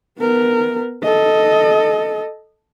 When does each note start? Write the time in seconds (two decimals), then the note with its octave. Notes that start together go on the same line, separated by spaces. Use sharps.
0.18 B3 A#4
1.03 A4 D#5